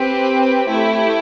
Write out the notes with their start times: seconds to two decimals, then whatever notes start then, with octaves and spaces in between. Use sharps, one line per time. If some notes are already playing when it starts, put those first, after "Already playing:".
Already playing: C4 G4 B4
0.69 A3 E4 G4